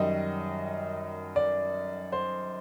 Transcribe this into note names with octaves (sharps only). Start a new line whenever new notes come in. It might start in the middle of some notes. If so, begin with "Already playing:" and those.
Already playing: F#2 D#3 G3 D#5
D5
C5